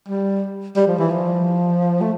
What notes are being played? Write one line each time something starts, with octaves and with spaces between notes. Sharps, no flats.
G3
G3
F3
E3
F3
A3